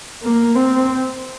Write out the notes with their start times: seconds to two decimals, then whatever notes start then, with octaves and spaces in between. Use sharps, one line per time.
0.23 A#3
0.56 C4